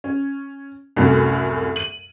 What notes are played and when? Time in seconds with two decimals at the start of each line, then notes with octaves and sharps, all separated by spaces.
0.04 C#4
0.96 C2 F#2 A2
1.76 D#7 F#7